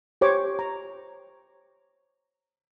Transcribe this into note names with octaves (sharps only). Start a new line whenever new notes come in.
G4 C5 C#5 D6
A#5